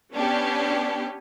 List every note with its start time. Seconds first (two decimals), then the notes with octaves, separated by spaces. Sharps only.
0.15 B3 C#4 D4 G4